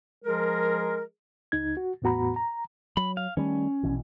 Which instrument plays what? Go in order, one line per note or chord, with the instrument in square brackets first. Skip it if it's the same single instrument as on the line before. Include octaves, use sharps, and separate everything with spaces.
[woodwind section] F3 G#3 G#4 A#4
[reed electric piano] C#2 D#4 G#6
F#4
E2 A2 B3 F#4 A#5 B5
A#5
[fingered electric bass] F#3 [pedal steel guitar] B5
[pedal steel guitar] F5
[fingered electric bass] D#3 G3 A3 [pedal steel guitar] C#4
[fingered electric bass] A#1 B2 E3